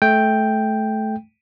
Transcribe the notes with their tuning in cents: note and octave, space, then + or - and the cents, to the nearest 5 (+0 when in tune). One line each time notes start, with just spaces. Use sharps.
A3 -20 G5 +0